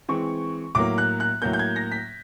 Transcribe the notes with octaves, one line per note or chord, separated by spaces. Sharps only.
E3 G#3 C4 C#6
A2 F#3 A#3 D6
F#6
F#6
A2 F#3 A#3 G6
G6
G#6
A#6
B6